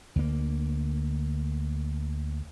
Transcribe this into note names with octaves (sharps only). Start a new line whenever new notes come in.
D2 A#3